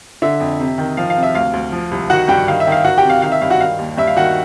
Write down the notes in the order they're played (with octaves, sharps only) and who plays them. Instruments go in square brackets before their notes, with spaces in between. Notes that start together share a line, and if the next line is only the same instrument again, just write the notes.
[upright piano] D3 E5
F2
C3
D#3
F3 F5
F5
C3
E5
D2 F5
D2
F3
C2
D#3 F#4 F#5
G2 G4 G5
D#3 F5
E5
D#3
F5
D#3 F#4 F#5
G4 G5
C3
F5
D#3 F5
E5
G2 F5
F#4 F#5
D#3 F5
D#2
G2 E5
F5
D#3 F#4 F#5